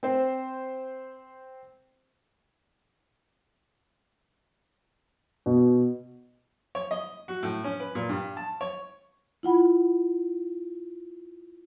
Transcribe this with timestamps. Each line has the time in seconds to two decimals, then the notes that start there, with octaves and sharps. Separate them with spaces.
0.03 C4 C5
5.46 B2
6.75 C#5
6.91 D#5
7.28 F#4
7.43 A2
7.64 C#4
7.80 B4
7.95 A#2
8.09 G2
8.37 A5
8.61 C#5
9.43 E4 F4 F#5 B5